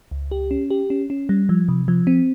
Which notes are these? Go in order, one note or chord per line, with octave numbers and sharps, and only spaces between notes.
C#2
G4
C#4
G4
C#4
C#4
G3
F3
C3
F3
C4